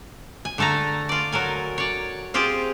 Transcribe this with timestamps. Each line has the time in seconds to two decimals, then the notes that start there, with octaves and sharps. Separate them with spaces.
0.45 G#5
0.58 D3 A3 A4 G#5 A#5
1.09 F4 D5
1.32 F#3 A4 A#4 G#5
1.78 C#5 D5
2.34 C4 F4 G4 G#4 C5